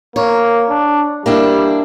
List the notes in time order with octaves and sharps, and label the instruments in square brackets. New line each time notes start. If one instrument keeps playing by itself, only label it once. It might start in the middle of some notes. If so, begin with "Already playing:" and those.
[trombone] A#3 [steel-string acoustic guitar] C#5
[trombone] D4
[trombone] G3 [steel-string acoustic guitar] A#3 D4 E4